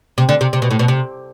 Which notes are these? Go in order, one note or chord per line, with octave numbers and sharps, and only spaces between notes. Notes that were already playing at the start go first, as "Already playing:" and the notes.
C3
D3
C3
C3
B2
A2
B2
C3